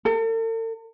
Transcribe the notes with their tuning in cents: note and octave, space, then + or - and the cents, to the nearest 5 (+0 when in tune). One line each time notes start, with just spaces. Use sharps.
A4 +45